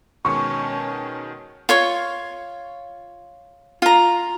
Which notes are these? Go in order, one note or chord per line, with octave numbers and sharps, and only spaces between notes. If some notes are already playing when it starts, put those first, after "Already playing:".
B2 D#3 G#3 C#4 A5 C#6
F4 C#5 C#6
F4 A#5